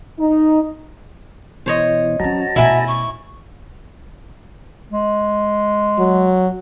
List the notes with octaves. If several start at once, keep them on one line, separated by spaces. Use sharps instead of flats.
D#4
B2 E3 C5 C#5 D#5
F#3 C#4 F#4 A5 A#5
B2 A3 E4 E5 G#5
C#6
G#3
F#3